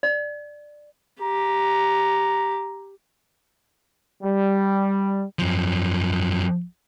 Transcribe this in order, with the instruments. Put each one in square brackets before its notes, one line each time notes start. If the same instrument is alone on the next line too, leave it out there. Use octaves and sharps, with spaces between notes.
[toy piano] D5
[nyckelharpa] G4 [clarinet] A#5
[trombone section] G3
[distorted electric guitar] F#2 F3